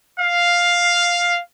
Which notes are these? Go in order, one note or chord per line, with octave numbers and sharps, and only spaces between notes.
F5